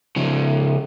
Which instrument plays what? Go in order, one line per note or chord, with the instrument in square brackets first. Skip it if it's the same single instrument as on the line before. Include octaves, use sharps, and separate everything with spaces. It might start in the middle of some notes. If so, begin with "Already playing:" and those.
[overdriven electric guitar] C#3 F3